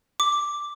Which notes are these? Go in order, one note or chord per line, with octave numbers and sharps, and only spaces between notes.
D6